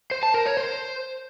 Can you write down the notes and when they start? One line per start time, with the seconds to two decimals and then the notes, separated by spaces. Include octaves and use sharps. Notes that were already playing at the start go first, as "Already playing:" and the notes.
0.11 C5
0.23 A5
0.34 A#4
0.46 C#5
0.57 C5